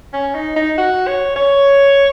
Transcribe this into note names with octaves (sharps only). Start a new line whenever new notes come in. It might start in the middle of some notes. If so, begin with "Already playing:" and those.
C#4
D#4
D#4
F#4
C#5
C#5